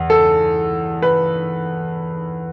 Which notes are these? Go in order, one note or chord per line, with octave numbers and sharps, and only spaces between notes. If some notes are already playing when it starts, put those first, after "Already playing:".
Already playing: E2
A4
B4